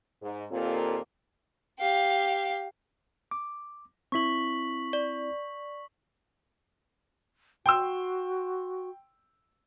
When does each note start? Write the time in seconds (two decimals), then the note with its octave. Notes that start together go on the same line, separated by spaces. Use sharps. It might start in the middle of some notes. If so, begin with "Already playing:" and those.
0.22 G#2
0.51 D#2 A#2 A#3 C4 F4 A4
1.80 G4 F5
3.31 D6
4.12 C4 E4 C#6 B6 F#7
4.93 D5
7.66 F#4 G5 C6 E6